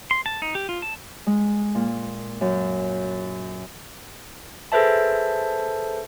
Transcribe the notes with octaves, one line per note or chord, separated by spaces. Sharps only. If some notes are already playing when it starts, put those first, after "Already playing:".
C6
A5
D#4
G4
F4
A5
G#3
A#2
F#2
G#4 A4 B4 C5 E5 A5